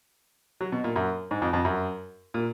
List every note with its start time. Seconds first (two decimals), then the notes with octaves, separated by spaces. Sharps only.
0.61 F#3
0.72 B2
0.84 A#2
0.96 F#2
1.31 G#2
1.42 F2
1.53 F2
1.65 F#2
2.34 A#2